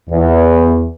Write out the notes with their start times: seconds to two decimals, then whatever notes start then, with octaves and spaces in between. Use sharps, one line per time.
0.10 E2